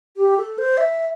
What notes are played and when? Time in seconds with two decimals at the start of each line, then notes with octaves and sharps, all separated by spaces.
0.17 G4
0.37 A4
0.58 C5
0.77 E5